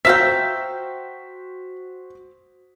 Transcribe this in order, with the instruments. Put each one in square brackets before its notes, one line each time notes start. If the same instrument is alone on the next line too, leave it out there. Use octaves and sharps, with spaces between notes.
[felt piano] F#4 C5 [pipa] E5 F5 [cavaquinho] G5 A#5 [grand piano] B6